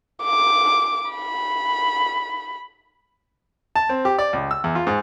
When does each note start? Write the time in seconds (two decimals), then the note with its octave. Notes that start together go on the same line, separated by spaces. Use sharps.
0.23 D6
1.11 B5
3.76 A5
3.89 C4
4.05 G4
4.18 D5
4.33 C#2
4.51 E6
4.64 E2
4.75 F4
4.87 G#2